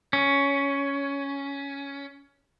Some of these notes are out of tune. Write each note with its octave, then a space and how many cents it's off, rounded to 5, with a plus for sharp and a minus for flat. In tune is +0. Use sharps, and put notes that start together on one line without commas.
C#4 +10